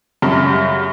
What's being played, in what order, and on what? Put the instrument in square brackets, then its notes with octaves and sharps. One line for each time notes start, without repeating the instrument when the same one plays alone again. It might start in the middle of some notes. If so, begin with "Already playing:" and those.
[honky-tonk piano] F#2 C#3 G3